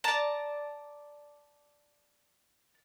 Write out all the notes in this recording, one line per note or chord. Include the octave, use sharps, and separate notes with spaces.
D5 A5 A#5